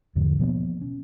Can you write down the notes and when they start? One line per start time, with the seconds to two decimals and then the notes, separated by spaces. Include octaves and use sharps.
0.15 E2 G#2 D3 F3
0.39 B2 F3 A#3 B3
0.81 C#4